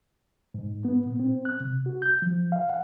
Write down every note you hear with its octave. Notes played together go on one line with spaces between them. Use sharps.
G#2
B3
A#2
C4
F#6
C3
F#4
G6
F3
F5
F#5